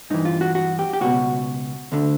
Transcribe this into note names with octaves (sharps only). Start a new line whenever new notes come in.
G2 E3 D#4
F4
F#4
F#4
G4
G4
C#2 B2 F#4
D2 D3